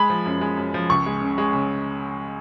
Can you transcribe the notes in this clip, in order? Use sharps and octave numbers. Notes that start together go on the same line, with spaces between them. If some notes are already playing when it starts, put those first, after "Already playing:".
Already playing: G#3 B5
F3
F#2
G#3
F#2
F3
C#2 C#6
G#3
C#3
G#3
C#3